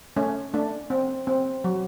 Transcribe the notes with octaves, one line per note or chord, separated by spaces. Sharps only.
A3 C#4
A3 D4
C4
C4
F#3